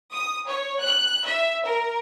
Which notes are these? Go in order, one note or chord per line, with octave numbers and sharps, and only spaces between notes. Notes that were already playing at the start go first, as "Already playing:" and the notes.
D#6
C#5
F#6
E5
A#4